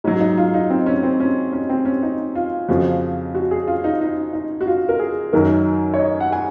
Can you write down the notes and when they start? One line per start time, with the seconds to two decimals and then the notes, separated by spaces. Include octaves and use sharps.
0.04 G#2 C#4
0.07 F#3
0.20 D#4
0.38 F4
0.54 D#4
0.70 C4
0.86 C#4
1.03 C4
1.20 C#4
1.53 C#4
1.69 C4
1.85 C#4
2.03 D#4
2.35 F4
2.69 F2 C#3 F3 F#4
3.34 F#4
3.51 G#4
3.67 F4
3.84 D#4
4.01 D#4
4.33 D#4
4.61 F#4
4.67 F4
4.89 A#4
4.99 G#4
5.33 F#2 D#3 F#3 A#4
5.94 C#5
5.99 D#5
6.20 F#5
6.32 G#5